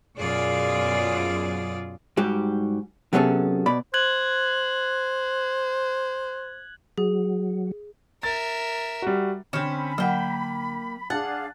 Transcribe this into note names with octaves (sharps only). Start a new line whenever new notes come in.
F#2 B2 F4 G#4 D5
G#2 G3 F#4 G4
C3 F#3 B3 C#4 G#4 A4
B2 D5 B5
C5 F#6 G#6 F#7
F#3 G#4
A#4 E5 A6
G3 F#4
D3 C4 C#4 B5 F6 E7
F#3 A#3 F#5 G5
D4 G#4 F5 F#5 A5 F#6 A6